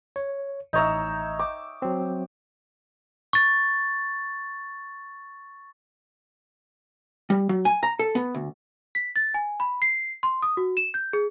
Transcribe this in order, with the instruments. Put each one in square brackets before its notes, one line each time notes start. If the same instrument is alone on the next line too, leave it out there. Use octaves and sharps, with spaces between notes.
[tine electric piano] C#5
[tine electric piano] A1 A#5 [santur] D#4 C#5 E5
[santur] D6
[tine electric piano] F#3 C4
[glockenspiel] C#6 A6
[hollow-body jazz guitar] G3
F#3
G#5
A#5
A4
B3
D2
[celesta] B6
A6
G#5
B5
C7
C6
D#6
F#4
E7
G6
G#4